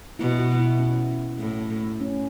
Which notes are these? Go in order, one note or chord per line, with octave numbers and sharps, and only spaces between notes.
B2 E4
F#4
E4
C#4
A2
C#4